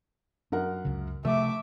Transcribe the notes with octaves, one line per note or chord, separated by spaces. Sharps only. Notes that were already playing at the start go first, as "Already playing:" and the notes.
F#2 D4 A#4 F#5
C#2 C#3
C3 F3 A3 E5 D6